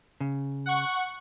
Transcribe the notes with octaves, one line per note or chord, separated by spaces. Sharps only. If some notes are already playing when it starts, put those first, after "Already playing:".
C#3
F#5 C#6